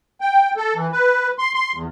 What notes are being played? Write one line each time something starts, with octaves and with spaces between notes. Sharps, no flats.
G5
A4
E3
B4
C6
C6
E2